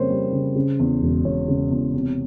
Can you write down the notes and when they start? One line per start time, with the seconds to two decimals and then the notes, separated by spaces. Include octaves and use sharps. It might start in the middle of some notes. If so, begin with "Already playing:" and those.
Already playing: F2 C#3 G3 A#3 C5 C#5
0.10 G3
0.32 C#3
0.56 C#3
0.79 E2
1.02 E1
1.24 E1 C#5
1.48 C#3
1.71 E2
1.94 C3